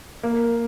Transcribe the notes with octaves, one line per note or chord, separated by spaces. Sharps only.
A#3